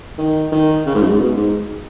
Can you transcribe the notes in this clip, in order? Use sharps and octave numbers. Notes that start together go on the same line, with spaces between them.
D#3
D#3
C#3
G#2
F#2
G#2
B2
G#2